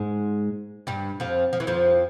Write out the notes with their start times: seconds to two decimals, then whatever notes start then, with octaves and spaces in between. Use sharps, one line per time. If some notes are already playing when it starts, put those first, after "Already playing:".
Already playing: G#2 G#3
0.87 G2 G3
1.20 F2 F3
1.53 F3
1.60 E3
1.67 F2 F3